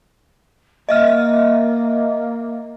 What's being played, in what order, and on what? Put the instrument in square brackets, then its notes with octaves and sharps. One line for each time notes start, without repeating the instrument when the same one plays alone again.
[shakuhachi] A#3 [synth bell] D#5 E5 F6